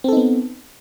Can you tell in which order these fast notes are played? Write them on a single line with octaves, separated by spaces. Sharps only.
C4 A4 D#4 B3